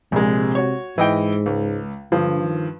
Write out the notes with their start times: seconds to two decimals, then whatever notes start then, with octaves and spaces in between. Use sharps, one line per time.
0.12 A#1 C3 G#3
0.55 F#4 C#5
0.98 G#2 E3 D#5 G5
1.46 C#2
2.12 G2 D3 F3
2.43 D#3